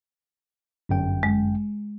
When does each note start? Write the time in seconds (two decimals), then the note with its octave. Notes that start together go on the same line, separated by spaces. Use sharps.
0.89 G1 F#2 G5
1.23 G#3